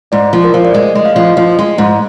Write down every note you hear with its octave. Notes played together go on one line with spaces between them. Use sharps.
G#2 D5
F3
A#4
F3 C5
D5
G#3 D#5
G#3 D#5
F5
F3
F3 D#5
G#3
G#2